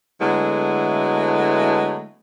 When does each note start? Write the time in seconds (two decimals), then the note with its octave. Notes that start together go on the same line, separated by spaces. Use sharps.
0.20 D3 F#3 G#3 A3 B3 E4